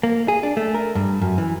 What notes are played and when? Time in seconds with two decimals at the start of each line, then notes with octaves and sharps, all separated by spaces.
0.03 A#3
0.28 G#4
0.43 D4
0.57 A3
0.74 A#4
0.95 G2
1.21 F#2
1.38 E3